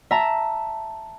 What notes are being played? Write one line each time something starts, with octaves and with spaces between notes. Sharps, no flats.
E5 A5 A#5